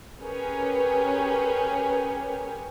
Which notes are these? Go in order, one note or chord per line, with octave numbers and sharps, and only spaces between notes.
C#4 G4 G#4 A#4 B4 C#5